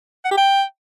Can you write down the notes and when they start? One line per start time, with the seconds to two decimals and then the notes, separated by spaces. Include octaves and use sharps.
0.25 F#5
0.31 G4
0.37 G5